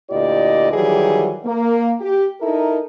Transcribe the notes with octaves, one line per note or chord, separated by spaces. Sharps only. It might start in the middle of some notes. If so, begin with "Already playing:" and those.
D2 A#2 E4 G4 D5 D#5
D#3 E3 F#3 G3 G4 G#4
A#3
G4
D#4 E4 A4 A#4